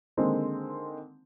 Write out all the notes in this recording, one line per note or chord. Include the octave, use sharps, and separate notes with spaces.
D3 D#3 G#3 A#3 C4